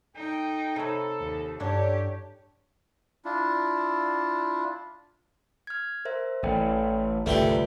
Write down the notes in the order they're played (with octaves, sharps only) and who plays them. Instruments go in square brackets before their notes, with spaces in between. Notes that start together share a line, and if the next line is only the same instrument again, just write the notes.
[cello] D#4 [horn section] A4 G5
[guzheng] C3 C#5 [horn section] A4 [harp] A#5 B5 E6
[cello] D#2
[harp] G2 [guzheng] F#3 D4 E4 [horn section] C#4 A4 C#5 [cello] G4
[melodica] D4 E4 F4
[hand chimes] F6 G#6
A#4 C5 E5
[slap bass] A1 E3 [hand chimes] A4 D5 G5
[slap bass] G1 C2 C#3 [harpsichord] A3 G4 [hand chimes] F4 B4 D5